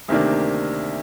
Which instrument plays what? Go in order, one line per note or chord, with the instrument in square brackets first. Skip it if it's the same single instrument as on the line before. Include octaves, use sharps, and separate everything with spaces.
[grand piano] D2 C3 D#3 A#3 D4